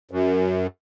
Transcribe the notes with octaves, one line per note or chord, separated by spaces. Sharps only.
F#2